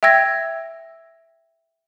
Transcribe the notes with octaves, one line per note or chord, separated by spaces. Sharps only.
E5 G5 E6 G#6 A#6